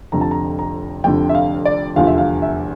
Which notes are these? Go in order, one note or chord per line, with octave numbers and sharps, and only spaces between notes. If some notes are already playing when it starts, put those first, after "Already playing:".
F1 F2 D3 A#5
A5
A#5
A#5
F1 F2 D3 G5
E5
F5
D5
F1 E2 D3 F3 F5
E5
F5
E5